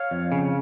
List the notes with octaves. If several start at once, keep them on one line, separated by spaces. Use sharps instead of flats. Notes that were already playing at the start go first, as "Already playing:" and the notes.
Already playing: C#5 F5
F2
C#3